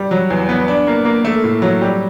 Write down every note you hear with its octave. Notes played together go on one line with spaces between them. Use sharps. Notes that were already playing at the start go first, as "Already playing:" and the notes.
Already playing: G3
F#3
E2
B3
D4
A#3
A#3
A3
A2
F#3
G3